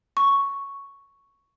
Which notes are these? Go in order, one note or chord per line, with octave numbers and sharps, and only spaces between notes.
C#6